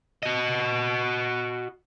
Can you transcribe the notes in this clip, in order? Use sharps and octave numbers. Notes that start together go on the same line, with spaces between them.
F#4 D#5